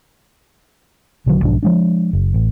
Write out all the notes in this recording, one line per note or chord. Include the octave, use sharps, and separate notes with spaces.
B1 D3 D#3 F#3
B1 G#2 F3 D4
F3 G#3 D4
F#1
A1